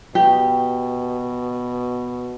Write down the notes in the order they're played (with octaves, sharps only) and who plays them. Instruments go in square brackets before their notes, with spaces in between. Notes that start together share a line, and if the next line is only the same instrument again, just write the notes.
[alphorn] B2 [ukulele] G4